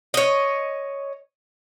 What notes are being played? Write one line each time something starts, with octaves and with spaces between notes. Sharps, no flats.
C#5 D#5